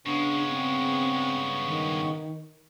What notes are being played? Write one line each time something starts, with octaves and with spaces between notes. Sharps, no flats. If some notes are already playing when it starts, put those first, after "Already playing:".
G2 C#3 G#3 B3 D4 C#6
C4
D#3